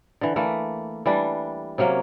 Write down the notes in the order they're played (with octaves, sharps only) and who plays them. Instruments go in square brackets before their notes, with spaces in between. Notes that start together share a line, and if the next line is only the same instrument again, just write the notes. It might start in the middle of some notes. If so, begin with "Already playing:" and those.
[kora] D3 E3
E3 A3 A#3
E3 G3 D4
C3 F#3 A#3 C#4